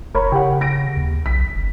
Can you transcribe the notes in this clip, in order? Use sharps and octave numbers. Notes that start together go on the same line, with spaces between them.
F#1 A#4 C#5 B5
C#3 G4 F#5
A#6 D7
D#2
B1 B6
F#1